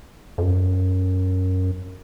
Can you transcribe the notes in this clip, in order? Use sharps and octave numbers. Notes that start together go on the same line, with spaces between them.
F2
F#2